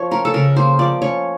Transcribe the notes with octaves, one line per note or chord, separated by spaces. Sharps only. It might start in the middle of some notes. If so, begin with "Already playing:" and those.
Already playing: F3 C#5
C#4 A#4
A4
C#3 A#4
A#3 C5
F3 D5
C#4 C#5